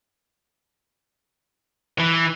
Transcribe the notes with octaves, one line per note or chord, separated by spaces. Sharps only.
E3